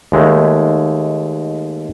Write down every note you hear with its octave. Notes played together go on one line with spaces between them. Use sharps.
D#2 G#3 A3